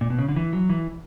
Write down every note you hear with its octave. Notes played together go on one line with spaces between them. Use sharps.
A#2
B2
C#3
D3
E3
F#3
E3